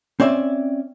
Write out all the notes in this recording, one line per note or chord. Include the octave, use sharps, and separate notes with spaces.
C4 C#4 D5 E5